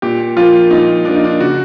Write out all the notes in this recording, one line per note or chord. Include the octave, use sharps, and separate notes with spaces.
A#2 G4
F3 A#3 F4
A#2 D#4
F3 A#3 D4
D#4
D4
C#3 F#4